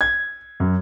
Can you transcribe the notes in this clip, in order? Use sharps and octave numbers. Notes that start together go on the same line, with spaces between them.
G#6
F#2